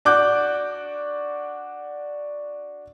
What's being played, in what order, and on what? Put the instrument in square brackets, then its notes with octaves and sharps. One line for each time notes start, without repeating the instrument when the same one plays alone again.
[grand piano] D4 F#4 D6 F#6 G6